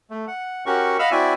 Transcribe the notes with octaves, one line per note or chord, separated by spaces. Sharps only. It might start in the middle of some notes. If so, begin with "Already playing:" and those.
A3
F#5
C#4 F#4 G4 A#4 F#5 C#6
D#5 F5 F#5 B5 E6 F6
C4 E4 F#4 D5 E5 G#5